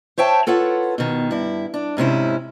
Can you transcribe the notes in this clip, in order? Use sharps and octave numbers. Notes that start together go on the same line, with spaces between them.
C5 C#5 E5 G5 A5
F4 A4 B4 C#5 F#5
B2 D#3
G2 E4
D4
G#2 C3 C#4 E4